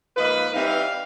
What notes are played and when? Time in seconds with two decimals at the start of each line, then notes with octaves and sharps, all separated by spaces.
0.16 G#2 F3 A#3 D#4 B4
0.53 E3 G3 C4 D#4 F5